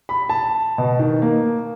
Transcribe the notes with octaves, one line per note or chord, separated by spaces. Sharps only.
B5
A5
B2
D#3
A#3